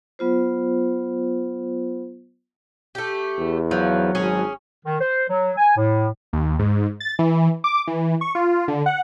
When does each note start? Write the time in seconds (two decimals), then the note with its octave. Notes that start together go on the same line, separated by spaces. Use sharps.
0.19 F#3 B3 F4 C5
2.95 A3 G4
3.38 E2
3.71 F3 F#3
4.15 G#1 C#4 G#4
4.85 D#3
5.00 C5
5.29 F#3
5.58 G#5
5.77 A2
6.33 D#2
6.59 G#2
7.00 A6
7.19 E3
7.64 D6
7.87 E3
8.21 C#6
8.35 F4
8.68 D3
8.86 F#5